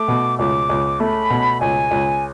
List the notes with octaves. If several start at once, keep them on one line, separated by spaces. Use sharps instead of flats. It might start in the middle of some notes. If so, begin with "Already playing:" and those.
Already playing: A3 D6
B2
C#2 D6
C#2
A3 B5
B2
C#2 G#5
C#2